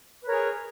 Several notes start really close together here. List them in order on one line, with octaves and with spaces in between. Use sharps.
B4 A#4 C#5 G#4